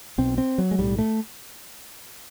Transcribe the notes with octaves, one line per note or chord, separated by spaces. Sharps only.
B1 B2 C4
C4
F#3
G#3
B1 A2 G3
A3